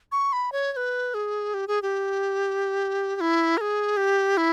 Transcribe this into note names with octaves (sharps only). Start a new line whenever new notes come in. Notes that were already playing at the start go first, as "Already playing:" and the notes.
C#6
B5
C#5
C#5
B4
G#4
G4
G#4
G4
G4
E4
A#4
G#4
G4
E4